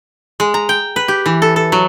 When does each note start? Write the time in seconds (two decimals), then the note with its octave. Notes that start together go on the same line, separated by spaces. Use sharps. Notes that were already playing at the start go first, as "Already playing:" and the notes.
0.40 G#3
0.54 A#5
0.69 G5
0.96 B4
1.08 G4
1.26 E3
1.42 A4
1.56 A4
1.72 F#3